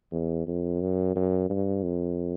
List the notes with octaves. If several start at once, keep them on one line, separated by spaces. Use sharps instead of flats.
E2
F2
F#2
F#2
G2
F2